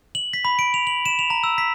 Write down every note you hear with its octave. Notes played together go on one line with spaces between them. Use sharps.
F#7
B6
B5
D7
F7
F#7
E7
F7
A#5
E6
B6